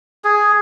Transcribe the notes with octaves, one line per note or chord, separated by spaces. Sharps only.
G#4